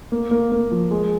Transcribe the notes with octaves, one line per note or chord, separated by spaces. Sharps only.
A#3
A#3
A#3
F3
G#3